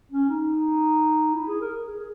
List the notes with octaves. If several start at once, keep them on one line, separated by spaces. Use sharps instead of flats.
C#4
D#4
E4
G#4
A#4
G#4
G#4